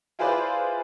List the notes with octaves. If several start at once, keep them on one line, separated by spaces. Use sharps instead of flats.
E4 F4 G#4 B4 C5 D5